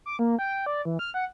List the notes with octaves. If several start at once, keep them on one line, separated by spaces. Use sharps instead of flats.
D6
A#3
G5
D5
E3
F6
F#5